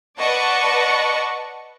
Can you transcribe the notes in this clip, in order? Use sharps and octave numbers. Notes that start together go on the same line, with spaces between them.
B4 D5 D#5 F#5 A5 C#6